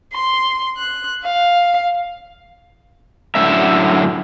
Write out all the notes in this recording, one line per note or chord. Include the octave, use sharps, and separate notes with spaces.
C6
F#6
F5
F#2 A2 D3 E3 B3 E5